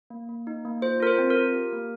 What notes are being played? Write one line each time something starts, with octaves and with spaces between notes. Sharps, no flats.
A#3
A#3
D#4
A#3
F4 C5
F4 A#4
C5
C4
A#4
F4
G4
A#3